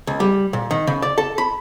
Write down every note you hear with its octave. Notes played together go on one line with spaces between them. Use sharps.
C#2
G3
A#2
D#3
C#3
D5
A4
B5